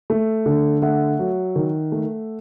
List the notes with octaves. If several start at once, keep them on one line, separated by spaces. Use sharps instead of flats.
A3
D3
A3 E5 F#5
F#3
D#3
A3